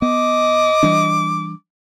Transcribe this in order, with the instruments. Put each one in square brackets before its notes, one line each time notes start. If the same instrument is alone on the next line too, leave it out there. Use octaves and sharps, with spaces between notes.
[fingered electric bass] B3 [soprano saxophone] D#5 [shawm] D6
[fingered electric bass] E3 G3 D4